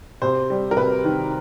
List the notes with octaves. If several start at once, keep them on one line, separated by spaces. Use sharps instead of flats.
C3 C5
G3
A#4
C3 B4
D#3